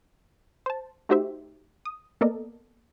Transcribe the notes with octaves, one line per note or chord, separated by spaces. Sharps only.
C5 A5
A3 D#4 F#4 G4 C5 E5
D#6
A#3 B3 A4 A#4 D5 D#5